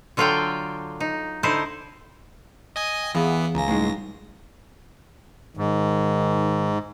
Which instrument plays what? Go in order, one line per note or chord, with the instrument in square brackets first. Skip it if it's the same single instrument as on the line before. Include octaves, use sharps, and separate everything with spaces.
[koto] D3 F#3 F4 A4 D5 G5
D#4
D3 D#4 E4 C5 A5
[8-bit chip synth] D#5 G#5 D#6
[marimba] G5
[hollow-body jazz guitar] E2 [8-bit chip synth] E3 B3 [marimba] G#4 F5
[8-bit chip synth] C#2 A#6 [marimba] F5 G#5 A#5
[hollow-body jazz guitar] A2 G#3 [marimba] G3 D#4
[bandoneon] G#2 [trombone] D#3